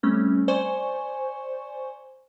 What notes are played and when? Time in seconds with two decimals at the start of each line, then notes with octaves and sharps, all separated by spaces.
0.03 G3 A3 C4 C#4
0.48 C5 D5 G#5 C#6